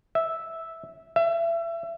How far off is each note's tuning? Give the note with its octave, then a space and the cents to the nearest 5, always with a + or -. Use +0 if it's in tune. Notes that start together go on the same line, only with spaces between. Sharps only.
E5 -5
E5 +30